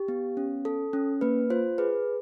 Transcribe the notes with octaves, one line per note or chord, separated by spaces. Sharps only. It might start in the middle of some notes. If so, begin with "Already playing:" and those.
Already playing: G4
B3
C#4
A4
C#4
A#3 B4
F4 C5
G#4 B4